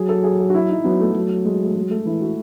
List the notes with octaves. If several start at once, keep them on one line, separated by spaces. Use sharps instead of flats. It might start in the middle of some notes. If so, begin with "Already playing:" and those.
Already playing: F#3 G#4
A4
G#4
G#4
F#4
E4
D#4
F#3 B3
A3
F#3
G#3
A3
G#3
A3
E3 E4
F#4